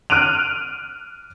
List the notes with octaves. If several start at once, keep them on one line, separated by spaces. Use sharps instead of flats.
F6 F#6 D7 D#7 F7